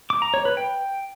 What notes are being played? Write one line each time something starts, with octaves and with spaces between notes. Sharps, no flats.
D6
A#5
C#5
B4
G5